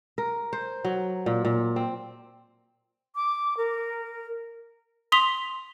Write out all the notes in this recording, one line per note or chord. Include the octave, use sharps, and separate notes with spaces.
A#4
C5
F#3
A#2
A#2
C4
D6
A#4
C6 D#6 B6 F7 G7